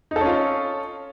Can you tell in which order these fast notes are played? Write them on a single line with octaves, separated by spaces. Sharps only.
D#4 A4 C#4 F4